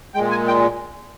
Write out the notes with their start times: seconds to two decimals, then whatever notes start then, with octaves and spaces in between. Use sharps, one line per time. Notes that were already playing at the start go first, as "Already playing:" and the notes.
0.14 A#2 G#3 G5
0.31 G#5
0.47 G5